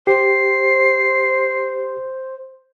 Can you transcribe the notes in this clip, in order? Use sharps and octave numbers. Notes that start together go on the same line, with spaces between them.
G4 C5 C7